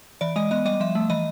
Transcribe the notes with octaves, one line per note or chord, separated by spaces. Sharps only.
E3 D5
G#3 D#5
B3 D#5
G3 D#5
F3 E5
A3
E3 D#5